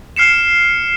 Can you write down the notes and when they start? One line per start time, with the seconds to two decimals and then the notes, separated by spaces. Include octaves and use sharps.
0.16 F6 C7 C#7 E7